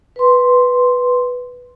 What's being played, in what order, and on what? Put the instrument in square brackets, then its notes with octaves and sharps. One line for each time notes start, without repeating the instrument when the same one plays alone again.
[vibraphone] B4 C6